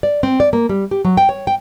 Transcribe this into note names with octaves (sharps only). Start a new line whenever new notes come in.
D5
C4
D5
A#3
G3
G4
F#3
G5
C#5
G5